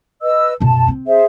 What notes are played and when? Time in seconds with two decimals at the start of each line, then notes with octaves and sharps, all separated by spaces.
0.22 B4 D#5 E6
0.60 F#2 B2 A5
0.88 C4
1.06 G#4 C5 E5